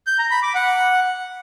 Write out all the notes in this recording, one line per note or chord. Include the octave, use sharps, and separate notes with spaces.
G6
A#5
B5
D6
F#5